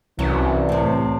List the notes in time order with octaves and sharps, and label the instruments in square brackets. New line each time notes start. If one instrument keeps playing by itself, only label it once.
[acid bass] C2 [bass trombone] E3 [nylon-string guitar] F#3 C#4
[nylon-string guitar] A2 C3